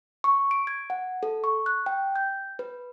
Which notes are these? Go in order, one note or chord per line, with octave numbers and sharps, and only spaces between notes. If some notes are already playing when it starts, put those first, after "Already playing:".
C#6
D7
G#6
F#5
A4
C#6
F#6
G5
G6
B4